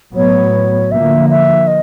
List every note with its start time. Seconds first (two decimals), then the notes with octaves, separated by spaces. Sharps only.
0.16 A2 F#3 B3 C#5
0.91 D3 F3 A#3 E5
1.30 E5
1.67 D#5